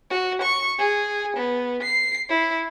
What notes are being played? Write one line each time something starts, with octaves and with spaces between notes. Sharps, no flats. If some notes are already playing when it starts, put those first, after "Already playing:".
F#4
C#6
G#4
B3
C7
E4